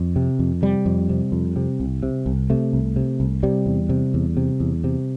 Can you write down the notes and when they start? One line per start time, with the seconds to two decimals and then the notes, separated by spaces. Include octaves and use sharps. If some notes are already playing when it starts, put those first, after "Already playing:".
Already playing: F2
0.16 C3
0.39 F2
0.62 C3 G3
0.86 F2
1.09 C3
1.32 F2
1.56 C3
1.80 C2
2.03 C3
2.26 C2
2.50 C3 A3
2.73 C2
2.96 C3
3.20 C2
3.43 C3 G3
3.66 E2
3.89 C3
4.14 E2
4.37 C3
4.60 E2
4.84 C3